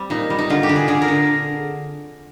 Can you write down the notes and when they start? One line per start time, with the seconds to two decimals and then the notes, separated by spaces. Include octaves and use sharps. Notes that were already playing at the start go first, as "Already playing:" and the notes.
Already playing: G3 C4
0.10 A#2 D#4
0.30 G3
0.39 D#4
0.50 D3 F4
0.63 G4
0.69 D3
0.76 G#4
0.88 D3 G#4
1.02 A#4
1.08 D3